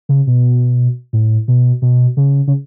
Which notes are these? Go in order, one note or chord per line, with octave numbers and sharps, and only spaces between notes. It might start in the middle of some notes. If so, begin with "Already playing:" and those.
C#3
B2
A2
B2
B2
C#3
C#3